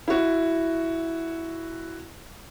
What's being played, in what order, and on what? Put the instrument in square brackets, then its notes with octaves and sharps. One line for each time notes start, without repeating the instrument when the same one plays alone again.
[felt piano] E4 F#4